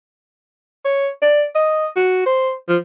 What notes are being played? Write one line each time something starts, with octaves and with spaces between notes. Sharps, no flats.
C#5
D5
D#5
F#4
C5
F3